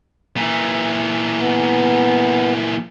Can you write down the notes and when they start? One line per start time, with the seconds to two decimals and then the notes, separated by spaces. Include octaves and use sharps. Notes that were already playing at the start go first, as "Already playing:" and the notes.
0.37 A#2 E3
1.38 B3